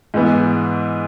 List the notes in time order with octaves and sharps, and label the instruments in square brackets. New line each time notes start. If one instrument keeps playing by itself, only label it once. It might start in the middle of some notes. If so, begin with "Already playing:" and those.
[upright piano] G#2 E3 B3